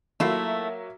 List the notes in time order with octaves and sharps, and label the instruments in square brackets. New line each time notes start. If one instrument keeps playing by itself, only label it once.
[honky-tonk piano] F#3 A#3 E5 [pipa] A3 E4 F4